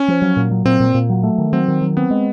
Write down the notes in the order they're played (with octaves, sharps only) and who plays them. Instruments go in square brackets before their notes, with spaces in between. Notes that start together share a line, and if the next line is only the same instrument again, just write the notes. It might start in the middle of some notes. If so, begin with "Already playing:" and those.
Already playing: [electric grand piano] C#4
[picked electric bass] F3
F#3
A#2
F#3
[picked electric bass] A#2 [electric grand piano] C4
[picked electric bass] A#2
A#2
F#3
A3
D#3
[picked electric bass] F#3 [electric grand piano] C4
[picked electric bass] D#3
F#3
[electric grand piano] B3 [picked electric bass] C4
[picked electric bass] G#3